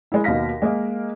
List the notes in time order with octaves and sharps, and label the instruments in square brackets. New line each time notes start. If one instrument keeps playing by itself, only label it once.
[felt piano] G#3 E4
D#2 B2 D#5 F5 A#6 B6
G#3 A#3 A#4 D#5 F5